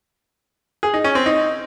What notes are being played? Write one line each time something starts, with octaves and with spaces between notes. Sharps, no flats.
G#4
D#4
C#4
C4
D#4